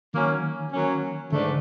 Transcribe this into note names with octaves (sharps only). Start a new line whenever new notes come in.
D#3 F#3 A#3 C#4
F#3 A#3 C#4
G#2 D3 E3 A3 D4